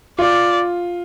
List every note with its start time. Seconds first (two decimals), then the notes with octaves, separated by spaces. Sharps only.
0.19 F4 D5